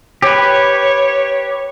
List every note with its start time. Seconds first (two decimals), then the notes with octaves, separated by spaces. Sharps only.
0.22 G4 B4 C#5